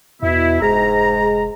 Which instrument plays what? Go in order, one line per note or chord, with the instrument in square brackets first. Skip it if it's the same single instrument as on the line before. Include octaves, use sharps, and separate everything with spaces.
[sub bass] E2 [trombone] B2 [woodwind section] E4
[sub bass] F1 [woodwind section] G#2 A#5 [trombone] G#3